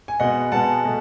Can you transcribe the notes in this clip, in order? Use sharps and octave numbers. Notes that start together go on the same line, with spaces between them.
G#5
B2 G#3 B3 D#5 F#5
B2 G#3 B3 F#5 A5
B2 A3